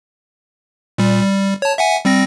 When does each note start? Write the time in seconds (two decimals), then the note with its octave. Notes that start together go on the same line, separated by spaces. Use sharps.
0.98 A#2 G3
1.22 G3
1.62 C#5 A5
1.78 E5 F#5 G#5
2.05 G3 C4 A#6